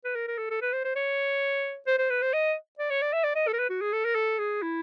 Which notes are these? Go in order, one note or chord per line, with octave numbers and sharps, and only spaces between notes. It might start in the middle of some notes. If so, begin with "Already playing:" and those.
B4
A#4
A#4
A4
A4
B4
C5
C5
C#5
C5
C5
B4
C5
D#5
D5
C#5
D5
E5
D5
D#5
A4
A#4
B4
F#4
G#4
A4
A#4
A4
G#4
E4